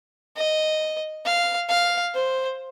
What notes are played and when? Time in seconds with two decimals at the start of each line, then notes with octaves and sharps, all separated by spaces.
0.37 D#5
1.25 F5
1.69 F5
2.14 C5